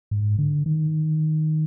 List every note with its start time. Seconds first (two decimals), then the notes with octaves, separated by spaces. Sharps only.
0.11 G#2
0.39 D3
0.66 D#3